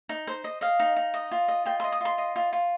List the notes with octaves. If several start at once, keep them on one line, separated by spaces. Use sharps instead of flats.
D#4
C5
D#5
D#5 F5
D#4
D#4
D#5
F4
D#5
F4 G5
C6
D#5
D#6
F4 C6
D#5
F4
F4